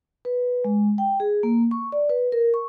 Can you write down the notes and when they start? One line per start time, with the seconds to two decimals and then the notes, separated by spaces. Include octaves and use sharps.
0.25 B4
0.65 G#3
0.98 G5
1.20 G#4
1.43 A#3
1.71 C#6
1.92 D5
2.09 B4
2.32 A#4
2.54 C#6